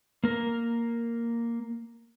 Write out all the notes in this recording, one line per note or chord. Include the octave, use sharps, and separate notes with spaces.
A#3 A#4